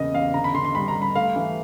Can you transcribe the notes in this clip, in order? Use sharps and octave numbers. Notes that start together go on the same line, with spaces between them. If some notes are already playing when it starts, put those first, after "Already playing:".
Already playing: E2 C#3 A#3 D#5
E2 F5
D3 A#5
B5
D3 C6
C6
G3 B5
A#5
G3
B5
A3 F5
E3